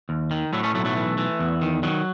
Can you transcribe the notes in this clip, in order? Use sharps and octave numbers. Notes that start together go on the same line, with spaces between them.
D#2
D#3
A2 F#3 A3
A3 C#4
B1 F#3 A3
F#3 A3
E3
E3
E2
D#3
D#3 F#3